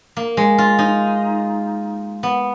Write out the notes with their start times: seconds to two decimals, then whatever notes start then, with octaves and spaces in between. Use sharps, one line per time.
0.17 A#3
0.37 G#3
0.58 F4
0.79 D#4
2.23 B3